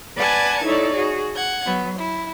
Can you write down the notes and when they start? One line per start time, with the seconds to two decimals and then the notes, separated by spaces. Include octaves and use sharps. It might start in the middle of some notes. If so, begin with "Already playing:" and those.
0.16 B4 D5 F#5 G#5 A5 G#6
0.64 D#4 E4 A4 C#5 D5
0.94 F#4 G#4
1.35 F#5 G#6
1.65 F#3 B3
1.98 E4